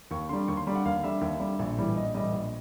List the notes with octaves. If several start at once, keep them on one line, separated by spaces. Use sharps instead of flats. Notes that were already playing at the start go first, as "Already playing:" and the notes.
D#2 C#6
D3 G3 C6
D#2 C#6
C6
D3 G3
F#5
D#2 F5
D3 G3 E5
D#2
D3 G3
A#1
A2 E3 G3
A#1 D#5
A2 E3 G3 D#5
A#1